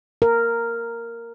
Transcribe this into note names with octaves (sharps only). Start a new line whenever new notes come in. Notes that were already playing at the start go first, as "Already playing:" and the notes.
A#4